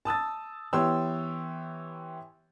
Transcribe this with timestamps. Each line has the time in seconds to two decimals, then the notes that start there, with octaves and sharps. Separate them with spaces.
0.05 A5 D#6 E6 A6
0.73 E3 B3 G4 C#5 C6 E6